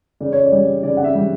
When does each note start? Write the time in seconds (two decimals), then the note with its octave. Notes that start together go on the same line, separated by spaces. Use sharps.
0.20 C#3 D5
0.33 C#5
0.45 D5
0.52 G3
0.83 C#3 D5
0.97 F#5
1.04 E5
1.15 G3